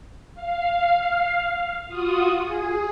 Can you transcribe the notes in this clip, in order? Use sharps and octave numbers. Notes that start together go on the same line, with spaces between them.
F5
F4 F#4 D#6
G#4